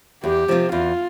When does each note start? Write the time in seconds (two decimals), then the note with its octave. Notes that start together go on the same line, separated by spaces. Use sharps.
0.24 E2 G4
0.48 C3 F3 C4 F4
0.72 E2 F4